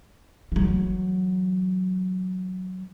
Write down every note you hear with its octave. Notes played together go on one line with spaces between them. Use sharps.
E3 F#3